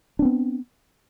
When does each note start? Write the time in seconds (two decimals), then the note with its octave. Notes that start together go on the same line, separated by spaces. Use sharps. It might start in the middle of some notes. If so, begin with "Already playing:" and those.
0.19 D4
0.22 C4
0.25 B3